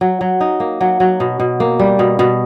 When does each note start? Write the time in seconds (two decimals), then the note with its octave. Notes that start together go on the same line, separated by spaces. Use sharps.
0.01 F#3
0.21 F#3
0.40 D#4
0.60 A#3
0.81 F#3
1.00 F#3
1.20 B2
1.40 B2
1.60 A#3
1.79 G3
1.99 B2
2.19 B2